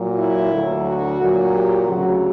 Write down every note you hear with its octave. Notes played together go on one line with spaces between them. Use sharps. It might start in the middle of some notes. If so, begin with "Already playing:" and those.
Already playing: A#2 F#3
E4
D2 D3 F#3
F#4
A#2 F#3
G4
D2 C#3 F#3 F#4